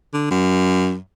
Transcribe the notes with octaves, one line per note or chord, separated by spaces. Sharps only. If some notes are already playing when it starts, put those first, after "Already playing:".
D3
F#2